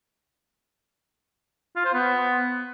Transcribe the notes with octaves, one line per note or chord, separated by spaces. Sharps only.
F4
C5
B3